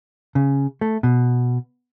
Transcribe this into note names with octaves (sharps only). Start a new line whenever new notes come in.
C#3
A3
B2